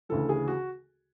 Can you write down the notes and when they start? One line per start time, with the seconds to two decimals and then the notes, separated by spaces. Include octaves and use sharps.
0.09 D2 C#3 E3 A4
0.29 G#4
0.48 F#4